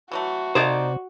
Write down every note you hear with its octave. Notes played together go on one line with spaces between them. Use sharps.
E3 F#3 A3 F#4
C3 F3 A#3 D#4 C5 D5